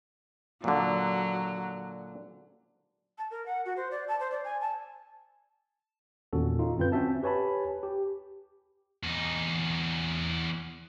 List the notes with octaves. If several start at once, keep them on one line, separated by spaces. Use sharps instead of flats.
A#2 D3 F#3
A5
A#4
F#5
F#4
C5
D5
A5
C5
D5
G#5
A5
E2 A#2 D#3 C#4 F#4 A4
D#4 F4
F#2 D3 C4 F4 B4 G6
C4 C#4 F#4 E5 A5
G4 B4 C#5 G#5 A5 B5
G4
E2 D#4